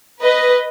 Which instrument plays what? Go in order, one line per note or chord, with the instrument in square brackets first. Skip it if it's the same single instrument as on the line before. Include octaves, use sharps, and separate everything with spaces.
[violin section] B4 D#5